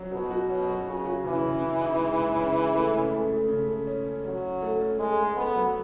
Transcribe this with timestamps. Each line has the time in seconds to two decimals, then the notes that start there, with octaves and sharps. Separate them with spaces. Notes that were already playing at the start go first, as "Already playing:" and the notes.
Already playing: F#3 C#4
0.11 B2 F#3
0.31 F#4
0.49 B2 C#4
0.68 F#3
0.86 C#3 F#4
1.05 F#4
1.24 C#3 E3
1.43 C#3
1.61 C#3
1.81 D#4
1.99 G#3
2.18 C#3
2.36 C#3
2.55 G#3
2.74 A3
2.93 C#3
3.12 A3
3.30 A3
3.48 C#3
3.67 A3
3.87 C#4
4.05 C#4
4.24 F#3 C#4
4.42 C#4
4.62 A3
4.81 C#4
4.99 G#3 A3
5.18 A3
5.36 A3 B3
5.56 F#3